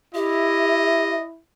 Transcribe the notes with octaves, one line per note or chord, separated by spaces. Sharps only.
E4 G4 D#5 E5